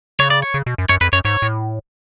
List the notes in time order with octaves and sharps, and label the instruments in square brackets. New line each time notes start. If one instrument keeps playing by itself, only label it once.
[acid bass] C#3 [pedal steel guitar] C#5
[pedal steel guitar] D5
C#5
[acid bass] C#3
B2
F#2
[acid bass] F#2 [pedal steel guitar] C#5
[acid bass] F2 [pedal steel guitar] B4
[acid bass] F#2 [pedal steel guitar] C#5
[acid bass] G#2 [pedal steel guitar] C#5
[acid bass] A2